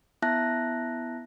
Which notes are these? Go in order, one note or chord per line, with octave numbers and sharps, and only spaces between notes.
B3 E4 E5 A5 F#6 A#6